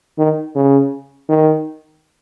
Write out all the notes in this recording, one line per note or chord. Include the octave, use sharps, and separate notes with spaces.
D#3
C#3
D#3